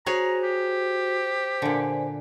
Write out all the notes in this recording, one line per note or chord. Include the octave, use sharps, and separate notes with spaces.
F#4 G#4 C5 C#5 G#5 A#5
G4
A#2 D3 G#5